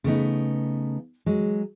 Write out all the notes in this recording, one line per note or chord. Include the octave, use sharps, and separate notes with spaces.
C#3 A3 B3 D#4
F#3 G#3